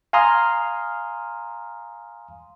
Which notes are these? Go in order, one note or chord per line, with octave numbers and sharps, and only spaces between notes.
F5 G#5 A#5 C6 D#6 F6